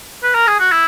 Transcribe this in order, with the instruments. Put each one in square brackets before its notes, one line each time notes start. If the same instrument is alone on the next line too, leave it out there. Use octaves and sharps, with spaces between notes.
[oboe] B4
A#4
G#4
F#4
E4